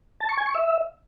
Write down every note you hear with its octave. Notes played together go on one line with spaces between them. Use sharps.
A5
C#6
G#5
C#6
E5